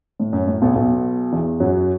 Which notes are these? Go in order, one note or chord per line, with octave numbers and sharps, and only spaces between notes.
A2
F#2
A2
B1 B2
B1 B2
E2 E3
F#2 F#3